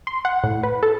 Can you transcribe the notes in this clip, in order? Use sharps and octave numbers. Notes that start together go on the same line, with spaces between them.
C6
F#5
A2
B4
A4